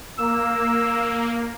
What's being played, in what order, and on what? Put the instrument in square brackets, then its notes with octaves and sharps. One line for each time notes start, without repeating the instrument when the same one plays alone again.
[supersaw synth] A#3 [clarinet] E6